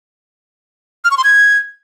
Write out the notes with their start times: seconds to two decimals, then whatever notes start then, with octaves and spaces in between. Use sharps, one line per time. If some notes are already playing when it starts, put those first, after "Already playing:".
1.04 F6
1.11 C#6
1.17 C6
1.24 G#6